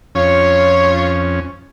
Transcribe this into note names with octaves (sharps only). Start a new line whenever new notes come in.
F2 C#4 F4 C#5